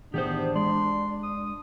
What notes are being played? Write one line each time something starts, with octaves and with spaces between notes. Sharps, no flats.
A2 D#3 E3 B3 D4 G4 G#4 C5
G#3 D5 C6
D#6